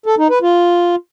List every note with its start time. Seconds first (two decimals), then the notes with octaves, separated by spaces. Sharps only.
0.06 A4
0.18 D#4
0.30 B4
0.42 F4